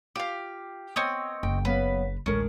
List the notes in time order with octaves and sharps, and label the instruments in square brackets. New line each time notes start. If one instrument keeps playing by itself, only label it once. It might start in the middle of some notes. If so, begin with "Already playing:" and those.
[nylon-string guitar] F4 [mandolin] G4 F5
[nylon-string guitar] B3 [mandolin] C4 C#5 D#5
[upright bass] F#1 [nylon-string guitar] G5
[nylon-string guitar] F#3 B3 F5 [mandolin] B4
[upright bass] A1 D2 [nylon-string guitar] G#3 D4 A#4 [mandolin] C#4